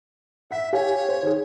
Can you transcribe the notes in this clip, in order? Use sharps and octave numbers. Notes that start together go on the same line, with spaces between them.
E5 F#5 B6
G4 C#5 F5 G#5
C5
D#3 G#4